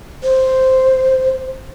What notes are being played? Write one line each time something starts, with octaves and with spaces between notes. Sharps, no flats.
C5